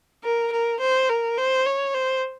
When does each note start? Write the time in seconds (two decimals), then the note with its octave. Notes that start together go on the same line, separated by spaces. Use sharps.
0.24 A#4
0.52 A#4
0.80 C5
1.09 A#4
1.37 C5
1.66 C#5
1.94 C5